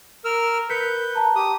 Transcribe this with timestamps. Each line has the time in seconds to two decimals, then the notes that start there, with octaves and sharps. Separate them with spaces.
0.25 A#4 E6 F6
0.70 A#4 B4 G6 B6 C#7
1.15 A5 A#5
1.36 G4 D#6